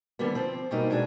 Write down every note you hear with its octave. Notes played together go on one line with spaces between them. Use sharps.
D3 D#3 F3 G3 A#3 B3
F3 C4
G#2 B2 G3 A3 A#3 D#4
B2 G#3 D4 G#4